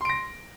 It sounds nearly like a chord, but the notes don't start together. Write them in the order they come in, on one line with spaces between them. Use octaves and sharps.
C6 D7 A#6